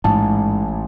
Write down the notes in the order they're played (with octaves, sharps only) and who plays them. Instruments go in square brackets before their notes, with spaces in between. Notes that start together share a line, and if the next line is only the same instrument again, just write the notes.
[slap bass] A1 [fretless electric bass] G#2 [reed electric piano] A5